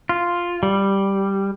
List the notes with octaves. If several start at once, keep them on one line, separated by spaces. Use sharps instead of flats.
F4
G3